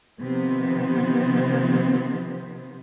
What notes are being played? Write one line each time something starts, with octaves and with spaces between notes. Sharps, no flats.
C3 D#3 F3 B3 C4